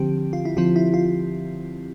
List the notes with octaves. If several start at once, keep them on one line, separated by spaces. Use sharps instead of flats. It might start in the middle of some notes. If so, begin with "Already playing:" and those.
Already playing: D3 F3 C4 G4
F4
E4
D3 F3 C4 F4
E4
F4